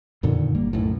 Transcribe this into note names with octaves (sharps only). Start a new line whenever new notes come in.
F2 A#2 D3 D#3
G1 G3 A#3
B1 F#2 A2